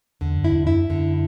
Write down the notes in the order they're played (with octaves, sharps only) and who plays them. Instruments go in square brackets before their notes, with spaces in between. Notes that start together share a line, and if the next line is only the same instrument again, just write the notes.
[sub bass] E2 [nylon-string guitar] D3
[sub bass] F#2
[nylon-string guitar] E4
[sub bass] E2
[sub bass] F#2 [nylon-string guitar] E4
[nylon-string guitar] D3